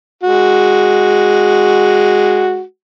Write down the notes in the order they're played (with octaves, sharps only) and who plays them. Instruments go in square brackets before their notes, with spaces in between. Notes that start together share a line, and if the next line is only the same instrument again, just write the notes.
[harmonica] G#3 F#4